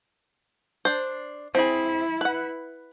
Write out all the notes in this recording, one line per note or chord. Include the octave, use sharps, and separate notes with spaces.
D4 C5
C4 E4 G#4
B4 F#5